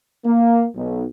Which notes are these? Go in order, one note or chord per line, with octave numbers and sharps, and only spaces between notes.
A#3
B1